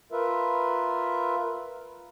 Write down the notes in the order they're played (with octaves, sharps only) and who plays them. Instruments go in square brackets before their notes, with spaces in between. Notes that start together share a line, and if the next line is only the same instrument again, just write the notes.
[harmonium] F4 A#4 B4 E5